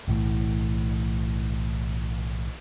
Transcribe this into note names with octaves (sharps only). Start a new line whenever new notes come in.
B1 A2 E3 A3